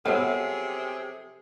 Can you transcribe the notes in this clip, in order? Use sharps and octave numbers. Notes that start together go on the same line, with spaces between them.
C3 F3 F#3 B3 G#4 A4 C#5 E5